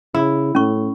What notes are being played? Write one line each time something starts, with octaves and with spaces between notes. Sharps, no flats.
C#3 E4
A2 C#4 C#6